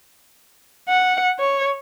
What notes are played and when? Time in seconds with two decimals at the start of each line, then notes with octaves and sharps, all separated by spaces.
0.88 F#5
1.39 C#5